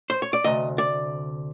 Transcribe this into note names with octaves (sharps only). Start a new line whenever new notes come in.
C5
C#5
D5
D2 C3 D#5
D5